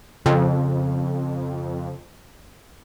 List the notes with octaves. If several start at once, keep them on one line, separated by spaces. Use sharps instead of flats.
F2 C#3 C4